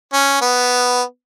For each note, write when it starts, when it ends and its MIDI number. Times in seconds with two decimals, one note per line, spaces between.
0.13 0.37 61
0.41 1.02 59